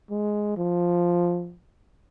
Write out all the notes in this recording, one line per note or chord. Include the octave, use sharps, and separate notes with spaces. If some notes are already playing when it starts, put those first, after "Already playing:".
G#3
F3